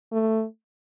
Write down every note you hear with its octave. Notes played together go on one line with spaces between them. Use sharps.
A3